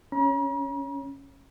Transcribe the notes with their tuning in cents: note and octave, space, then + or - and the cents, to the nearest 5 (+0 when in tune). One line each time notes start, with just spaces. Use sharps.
C#4 +0 A#5 +45